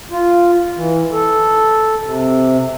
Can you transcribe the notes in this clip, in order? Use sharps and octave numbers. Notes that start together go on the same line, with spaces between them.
F4
E3
A4
C3